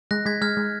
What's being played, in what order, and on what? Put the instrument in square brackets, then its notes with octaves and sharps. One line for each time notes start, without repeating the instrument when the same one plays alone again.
[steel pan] G#3 [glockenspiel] F#6 A#6
[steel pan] G#3 [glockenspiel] G#6 B6
[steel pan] G#3 [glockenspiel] F6 G#6
[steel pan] G#3